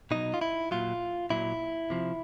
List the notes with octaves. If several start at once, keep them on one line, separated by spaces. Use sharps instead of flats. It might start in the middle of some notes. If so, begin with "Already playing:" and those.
B2 F#3 D#4
F4
E4
A#2 F#3 F4
A#2 F#3 E4
C3 F3